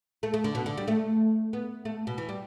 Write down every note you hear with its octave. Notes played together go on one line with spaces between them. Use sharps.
A3
A3
D3
B2
D3
G3
A3
B3
A3
B2
E3
G3